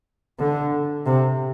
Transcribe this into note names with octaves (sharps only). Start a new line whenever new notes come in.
D3
C3